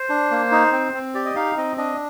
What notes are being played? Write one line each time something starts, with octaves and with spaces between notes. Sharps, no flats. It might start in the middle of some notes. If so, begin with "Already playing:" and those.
Already playing: C5
D4
A#3
D#4
C4
C4
G4 D5
D#5
D#4 F5
C4 D#5
D4 D#5